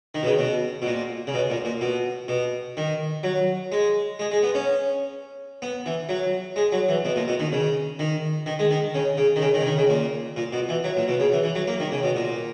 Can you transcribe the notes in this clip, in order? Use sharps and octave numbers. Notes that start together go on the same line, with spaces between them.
D#3
B2
C#3
B2
B2
A#2
C#3
B2
A#2
A#2
B2
B2
D#3
F#3
G#3
G#3
G#3
B3
C#4
B3
E3
F#3
G#3
F#3
E3
B2
A#2
B2
D#3
C#3
D#3
D#3
G#3
D#3
C#3
C#3
D#3
C#3
D#3
C#3
D#3
C#3
A#2
A#2
B2
E3
F#3
A#2
B2
C#3
E3
E3
F#3
A#3
D#3
C#3
B2
A#2